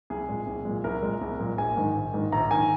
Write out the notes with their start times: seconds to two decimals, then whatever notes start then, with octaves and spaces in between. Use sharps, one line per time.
0.10 C2 G#4
0.29 A#2 G#3
0.47 C2
0.65 A#2 G#3
0.84 C2 A#4
1.03 A#2 G#3
1.21 C2
1.40 A#2 G#3
1.58 A#1 G#5
1.77 G#2 D#3
1.96 A#1
2.14 G#2 D#3
2.32 A#1 A#5
2.51 D#3 G#5